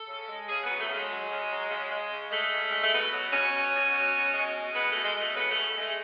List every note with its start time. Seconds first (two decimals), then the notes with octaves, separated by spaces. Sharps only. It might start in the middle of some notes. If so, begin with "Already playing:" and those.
Already playing: A4
0.08 C#3
0.28 G#3
0.49 C#3 G#4
0.63 B3
0.69 F#3
0.79 A3
0.89 C#3
0.94 G#3
1.09 F#3
1.29 C#3
1.50 F#3
1.70 C#3
1.91 G#3
2.10 C#3
2.31 G#3 A3
2.51 C#3
2.71 G#3
2.83 A3
2.91 B2 B3
3.12 F#3
3.32 B2 C#4
3.52 F#3
3.73 B2
3.92 F#3
4.13 B2
4.33 G#3
4.54 B2
4.74 G#3 B3
4.89 A3
4.95 B2
5.04 G#3
5.14 G#3 A3
5.34 C#3 B3
5.50 C#3 A3
5.75 G#3
5.80 A3